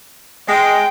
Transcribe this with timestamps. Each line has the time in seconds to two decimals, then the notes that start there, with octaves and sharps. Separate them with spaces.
0.49 G#3 G5